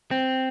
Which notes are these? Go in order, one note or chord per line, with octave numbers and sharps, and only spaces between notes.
C4